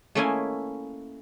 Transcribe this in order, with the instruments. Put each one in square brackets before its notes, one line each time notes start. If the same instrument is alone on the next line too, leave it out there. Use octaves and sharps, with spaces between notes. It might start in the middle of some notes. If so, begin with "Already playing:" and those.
[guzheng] A3 A#3 C#4 E4 D#5 G#5